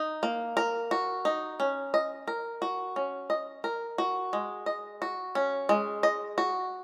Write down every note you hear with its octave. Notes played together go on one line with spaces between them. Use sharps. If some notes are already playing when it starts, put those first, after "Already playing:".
Already playing: D#4
A#3
A#4
F#4
D#4
C#4
D#5
A#4
F#4
C#4
D#5
A#4
F#4
G#3
D#5
F#4
C#4
G#3
D#5
F#4